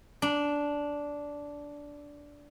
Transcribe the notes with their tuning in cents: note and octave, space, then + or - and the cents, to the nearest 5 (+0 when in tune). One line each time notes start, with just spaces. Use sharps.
D4 -10